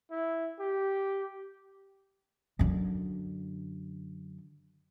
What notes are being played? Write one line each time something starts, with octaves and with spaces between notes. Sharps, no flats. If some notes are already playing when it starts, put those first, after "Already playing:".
E4
G4
F#2 D3